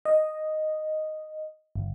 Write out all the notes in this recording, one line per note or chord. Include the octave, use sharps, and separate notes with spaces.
D#5
G1